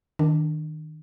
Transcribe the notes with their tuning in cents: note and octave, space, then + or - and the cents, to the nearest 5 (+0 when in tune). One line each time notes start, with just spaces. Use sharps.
D#3 +0 D4 +0